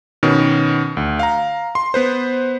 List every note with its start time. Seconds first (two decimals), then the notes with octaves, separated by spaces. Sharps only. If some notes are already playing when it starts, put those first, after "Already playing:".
0.23 B2 D#3 B3 C#4
0.97 D2
1.19 F5 A#5
1.75 C6
1.94 B3 B4 C5